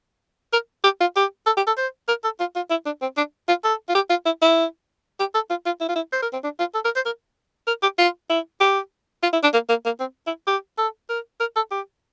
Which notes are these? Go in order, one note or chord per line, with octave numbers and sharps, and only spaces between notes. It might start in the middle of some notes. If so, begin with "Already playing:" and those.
A#4
G4
F4
G4
A4
G4
A4
C5
A#4
A4
F4
F4
E4
D4
C4
D4
F4
A4
F4
G4
F4
E4
E4
G4
A4
F4
F4
E4
F4
E4
C5
A#4
C4
D4
F4
A4
A#4
C5
A#4
A#4
G4
F4
E4
G4
F4
E4
D4
A#3
A#3
A#3
C4
E4
G4
A4
A#4
A#4
A4
G4